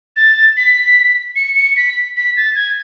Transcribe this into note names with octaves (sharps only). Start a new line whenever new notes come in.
A6
B6
C#7
C#7
B6
B6
A6
G#6